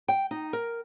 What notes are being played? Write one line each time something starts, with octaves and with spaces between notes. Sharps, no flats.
G5
D#4
A#4